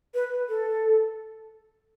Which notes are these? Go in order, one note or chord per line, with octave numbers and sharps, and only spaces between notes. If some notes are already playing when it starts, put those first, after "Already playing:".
B4
A4